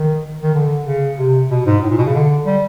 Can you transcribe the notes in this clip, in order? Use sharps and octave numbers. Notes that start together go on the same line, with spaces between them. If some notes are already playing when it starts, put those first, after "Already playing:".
Already playing: D#3
D#3
D3
C#3
C3
B2
G#2
A2
A#2
B2
C#3
D3
G3